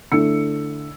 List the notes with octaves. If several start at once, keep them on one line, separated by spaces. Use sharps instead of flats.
D3 A3 D4 E4 E6 C#7